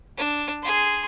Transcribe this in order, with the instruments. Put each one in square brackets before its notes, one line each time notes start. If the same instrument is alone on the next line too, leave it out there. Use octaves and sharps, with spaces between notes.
[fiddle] D4
G#4 C6